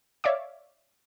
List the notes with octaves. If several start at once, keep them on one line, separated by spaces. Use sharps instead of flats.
C#5 D5 E5 F5 D6